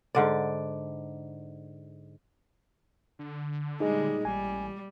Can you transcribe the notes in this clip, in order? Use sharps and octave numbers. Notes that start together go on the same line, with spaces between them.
G#2 D3 D5
D3
A#2 G3 G#3 D#4 G#4 D#5
A1 G3 G#5